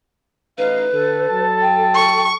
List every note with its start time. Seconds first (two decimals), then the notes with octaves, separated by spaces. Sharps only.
0.58 A1 D#4 B4 F5
0.92 D3 A4
1.30 F#3 A5
1.61 G5
1.95 C#6